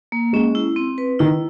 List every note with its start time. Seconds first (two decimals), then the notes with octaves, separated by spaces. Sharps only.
0.12 A#3
0.33 G#3 C#4
0.55 E4
0.76 C4
0.98 B4
1.19 D#3 E4